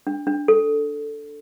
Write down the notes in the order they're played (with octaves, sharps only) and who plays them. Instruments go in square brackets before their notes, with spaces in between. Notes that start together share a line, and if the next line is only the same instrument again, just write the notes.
[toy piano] D4
D4
A4